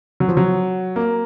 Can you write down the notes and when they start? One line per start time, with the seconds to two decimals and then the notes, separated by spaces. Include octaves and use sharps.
0.20 F#3
0.28 F3
0.37 F#3
0.96 A#3